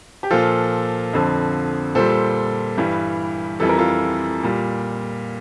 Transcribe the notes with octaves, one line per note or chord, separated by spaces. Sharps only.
G4
A#2 F3 F4 A4
F2 D3 F3
A#2 G3 A4 C5
G2 E3 G3
F2 E3 G3 A4
A#4
F4 A4
A#2 G3